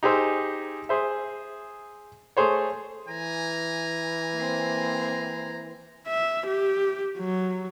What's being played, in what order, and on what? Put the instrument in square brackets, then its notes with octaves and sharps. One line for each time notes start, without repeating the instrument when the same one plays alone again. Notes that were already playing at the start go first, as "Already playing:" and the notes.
[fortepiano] D#4 G4 G#4 C5 E6
G#4 C5 E5
A3 G#4 C5 C#5
[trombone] E3 [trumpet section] G#5 A#5
[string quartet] A#3 C4
[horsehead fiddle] E5
G4
F#3